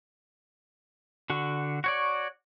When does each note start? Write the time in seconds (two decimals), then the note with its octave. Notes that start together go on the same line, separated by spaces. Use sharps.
1.30 D3 F#4
1.84 F#4 C#5 D5